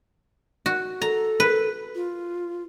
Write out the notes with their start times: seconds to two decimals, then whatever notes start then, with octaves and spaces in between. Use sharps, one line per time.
0.66 F#4
1.02 A4 A#5
1.40 B4
1.95 F4